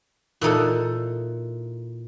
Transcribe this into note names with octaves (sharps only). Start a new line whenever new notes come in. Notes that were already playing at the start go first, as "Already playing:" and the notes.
A#2 E3 D#4 A4